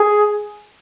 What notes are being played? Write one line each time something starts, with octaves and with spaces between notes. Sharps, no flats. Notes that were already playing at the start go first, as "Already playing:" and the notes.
Already playing: G#4